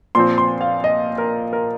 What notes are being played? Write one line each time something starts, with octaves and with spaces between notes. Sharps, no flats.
A#2 F3 C4 C6
C6
F5
D#5
A#4
A#4